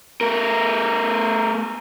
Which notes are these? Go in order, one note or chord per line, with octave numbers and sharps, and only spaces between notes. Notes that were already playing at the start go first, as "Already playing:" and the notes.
A3 A#4